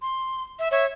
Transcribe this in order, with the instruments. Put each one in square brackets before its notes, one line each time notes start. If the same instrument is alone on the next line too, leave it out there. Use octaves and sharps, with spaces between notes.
[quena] C6
E5
[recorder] C#5 [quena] E5